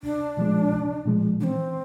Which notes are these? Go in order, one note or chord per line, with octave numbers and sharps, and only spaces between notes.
C2 D4
A#2 F3 G#3
C2
A#2 F3 G#3
E3 C4 D4